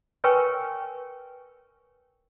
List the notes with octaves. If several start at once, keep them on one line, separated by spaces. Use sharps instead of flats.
A#4 B4 C#5 G5 G#5 C#6